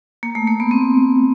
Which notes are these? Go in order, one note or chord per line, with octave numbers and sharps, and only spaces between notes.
A#3
A3
A#3
B3
C4